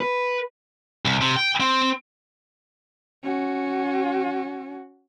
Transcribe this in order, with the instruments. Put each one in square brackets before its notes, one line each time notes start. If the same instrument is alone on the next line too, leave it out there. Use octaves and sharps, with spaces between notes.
[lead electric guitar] B4
[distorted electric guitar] C2
C3
G5
C4
[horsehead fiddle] C#4 F#4